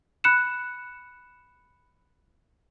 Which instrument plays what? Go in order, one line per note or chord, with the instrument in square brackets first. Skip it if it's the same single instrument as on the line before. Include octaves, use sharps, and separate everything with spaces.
[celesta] B5 F#6 C#7 E7